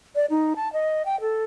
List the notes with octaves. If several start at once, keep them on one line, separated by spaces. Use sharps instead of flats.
D5
D#4
A5
D#5
G5
A4